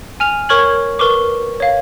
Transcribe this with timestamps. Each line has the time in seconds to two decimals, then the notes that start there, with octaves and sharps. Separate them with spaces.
0.20 G#5 F6 F7
0.49 A#4 C#5 C#6 F6 G#6 F#7
0.99 A#4 B4 C#6 D6
1.60 C#5 F5